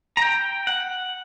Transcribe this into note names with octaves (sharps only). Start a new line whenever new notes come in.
A#5
G5
F#5